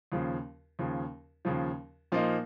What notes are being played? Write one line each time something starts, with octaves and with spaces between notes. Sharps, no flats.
D#2 C#3 F3
D#2 C#3 F3
D#2 C#3 F3
A#2 F3 A#3 D#4